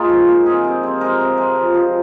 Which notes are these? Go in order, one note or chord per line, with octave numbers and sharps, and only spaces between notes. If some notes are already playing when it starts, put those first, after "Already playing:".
Already playing: G#2 A#3 D#4 F4 G#4 A#4
F3
A#3
C4 G#4
C3
C4
G#3 A#4
C3
G#3
F3
F3